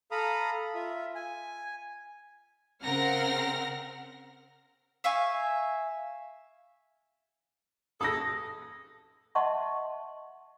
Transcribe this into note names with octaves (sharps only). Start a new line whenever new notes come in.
A4 F5 A#5 B5 D#6
F4 E5
G#5
C#3 C4 A#4 F#5 F6 A#6
E5 F5 G#5 C#6
G#4 A4 D#6 A#6
D#5 E5 F#5 A5 C6 C#6